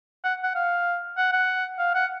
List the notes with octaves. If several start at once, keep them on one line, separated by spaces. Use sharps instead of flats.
F#5
F#5
F5
F#5
F#5
F5
F#5